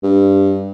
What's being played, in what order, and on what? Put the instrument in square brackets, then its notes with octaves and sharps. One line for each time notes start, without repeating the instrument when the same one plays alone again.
[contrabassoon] G2